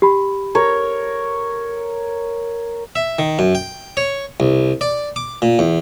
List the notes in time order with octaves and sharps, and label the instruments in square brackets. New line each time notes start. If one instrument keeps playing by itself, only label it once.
[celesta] G4 B5
[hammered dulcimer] A#4 C#5
[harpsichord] E5
D#3
F#2
G5
C#5
C2
D5
D6
A#2
E2